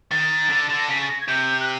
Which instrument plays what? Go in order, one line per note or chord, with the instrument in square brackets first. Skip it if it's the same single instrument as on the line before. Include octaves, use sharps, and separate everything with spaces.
[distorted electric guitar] D#3 [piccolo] A6
[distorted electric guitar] D3
D3
[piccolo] A#6
[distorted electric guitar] C#3 [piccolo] B6
[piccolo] A6
A#6
G#6
[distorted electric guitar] C3 [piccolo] G6
[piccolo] F#6